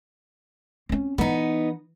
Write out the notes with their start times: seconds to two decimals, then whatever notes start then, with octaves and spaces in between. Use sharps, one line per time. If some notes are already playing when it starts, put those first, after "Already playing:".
0.89 C4 C#4
1.18 E3 B3 D#4